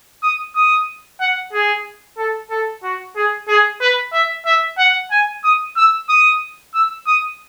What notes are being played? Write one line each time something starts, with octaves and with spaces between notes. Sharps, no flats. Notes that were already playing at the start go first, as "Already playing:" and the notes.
D#6
D#6
F#5
G#4
A4
A4
F#4
G#4
G#4
B4
E5
E5
F#5
G#5
D#6
E6
D#6
E6
D#6